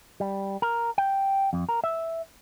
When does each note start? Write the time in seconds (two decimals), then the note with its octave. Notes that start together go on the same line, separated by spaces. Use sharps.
0.20 G3
0.62 A#4
0.98 G5
1.53 F2
1.69 A#4
1.84 E5